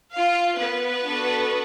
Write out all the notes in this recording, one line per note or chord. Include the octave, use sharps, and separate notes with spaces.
F4 F5
B3 B4
D4 F#4 A4